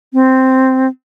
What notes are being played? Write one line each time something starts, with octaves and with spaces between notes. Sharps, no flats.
C4